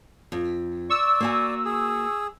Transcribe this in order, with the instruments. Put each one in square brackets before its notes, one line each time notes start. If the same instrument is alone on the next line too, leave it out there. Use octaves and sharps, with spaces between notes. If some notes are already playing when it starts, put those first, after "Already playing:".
[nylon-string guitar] F2
[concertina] D5 [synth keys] C#6 E6
[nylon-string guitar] A#3 F#4 G#5
[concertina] G#4